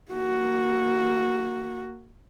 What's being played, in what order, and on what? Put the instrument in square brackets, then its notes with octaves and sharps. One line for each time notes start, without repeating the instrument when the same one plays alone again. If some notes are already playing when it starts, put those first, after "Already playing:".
[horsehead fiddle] A#3 F#4